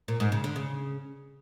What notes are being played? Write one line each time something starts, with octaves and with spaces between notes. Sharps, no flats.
A#2
G#2
C#3
D3
C#3